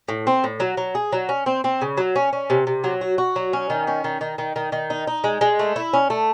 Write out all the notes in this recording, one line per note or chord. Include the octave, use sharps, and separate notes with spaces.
A2
C4
A2
F#3
F#3
G#4
F#3
C#4
C4
C4
C#3
F#3
C#4
C#4
C3
C3
F#3
F#4
F#4
F#3
C#4
D#3
C#4
D#3
D#3
D#3
D#3
D#3
D#4
D#4
G#3
G#3
A3
E4
C#4
A3